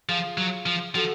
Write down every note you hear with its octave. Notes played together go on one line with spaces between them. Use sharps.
F3 F4 G#4
F#3
F3
F3 F#4 A4